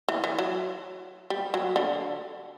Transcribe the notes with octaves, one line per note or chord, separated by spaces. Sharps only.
E3
E3
F#3
G3
F#3
D3